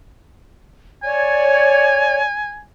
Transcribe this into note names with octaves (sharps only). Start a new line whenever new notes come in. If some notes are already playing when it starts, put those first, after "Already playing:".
C#5 D5 G#5